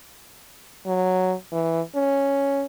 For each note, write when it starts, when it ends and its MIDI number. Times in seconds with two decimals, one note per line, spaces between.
0.87 1.34 54
1.52 1.81 52
1.95 2.65 61